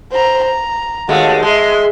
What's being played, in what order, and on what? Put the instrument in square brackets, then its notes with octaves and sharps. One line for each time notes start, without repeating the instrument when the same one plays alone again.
[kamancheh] C5 A#5
A#5
[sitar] D#2 G#3 A3 [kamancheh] F#4 F5
[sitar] G#3 [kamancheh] E5 C6